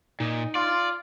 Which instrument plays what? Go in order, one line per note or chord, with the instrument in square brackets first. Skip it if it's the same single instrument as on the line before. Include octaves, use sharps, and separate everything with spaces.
[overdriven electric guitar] A#2 [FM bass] D#4
[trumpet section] F4 [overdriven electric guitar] D5